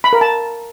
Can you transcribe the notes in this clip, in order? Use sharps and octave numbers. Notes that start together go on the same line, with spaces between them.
B5
A#4
A5